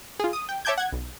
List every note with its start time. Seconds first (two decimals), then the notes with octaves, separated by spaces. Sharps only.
0.20 F4 G#4
0.33 D#6
0.49 G5
0.65 C#5 E5 A5 D6 G6 G#6
0.78 F#5 G#6
0.93 B1